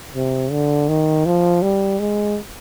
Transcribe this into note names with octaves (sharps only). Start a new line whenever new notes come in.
C3
D3
D#3
F3
G3
G#3